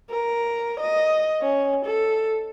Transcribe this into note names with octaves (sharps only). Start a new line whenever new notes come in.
A#4
D#5
C#4
A4